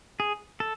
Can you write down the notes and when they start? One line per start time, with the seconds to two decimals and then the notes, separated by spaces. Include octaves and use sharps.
0.20 G#4
0.60 A4